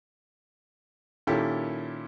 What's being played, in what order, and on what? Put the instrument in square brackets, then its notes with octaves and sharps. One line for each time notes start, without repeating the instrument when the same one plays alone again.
[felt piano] A#2 D#3 C#4 E4 G4 A4